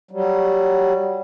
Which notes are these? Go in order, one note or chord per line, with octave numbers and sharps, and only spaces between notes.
F#3 G3